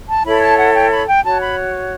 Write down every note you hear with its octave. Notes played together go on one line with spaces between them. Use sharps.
A5
E4 A4 C#5 B5
A5
F#5
G5
B5
G5
F#4 C#5 A5
B5